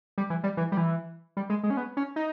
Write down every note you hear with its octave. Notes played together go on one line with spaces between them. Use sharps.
G3
E3
G3
E3
G3
E3
G3
G#3
G#3
C#4
B3
C#4
D#4